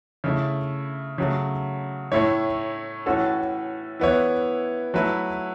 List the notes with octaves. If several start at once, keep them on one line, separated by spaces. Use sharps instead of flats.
C#3 A3 E4
C#3 F#3 A3
A2 A3 E4 C#5
A2 E3 C#4 F#4 A4
E3 B3 E4 C#5
F#3 A3 E4 B4